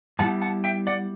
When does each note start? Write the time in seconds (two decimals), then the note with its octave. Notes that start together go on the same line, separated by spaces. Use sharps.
0.19 A2 G3 B3 E4 F#5 A5
0.41 F#5 A5
0.64 E5 G5
0.87 D5 F#5